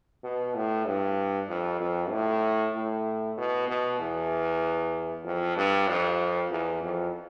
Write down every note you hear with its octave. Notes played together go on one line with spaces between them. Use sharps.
B2
A2
G2
F2
F2
A2
A2
B2
B2
E2
F2
G2
F2
E2
F2